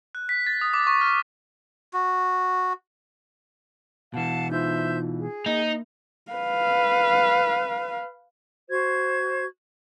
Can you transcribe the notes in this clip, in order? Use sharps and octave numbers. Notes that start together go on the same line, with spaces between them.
F#6
B6
A6
D#6
D6
C#6
F6
F#4
B2 E3 F5 F#5 A5
D#4 F4 C5 E5 G6
G#4
A#3 D#4
B4 F5
F#4 C5 G#6